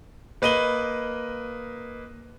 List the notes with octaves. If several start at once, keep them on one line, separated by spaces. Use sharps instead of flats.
A#3 B4 D#5 D#7 F#7 G7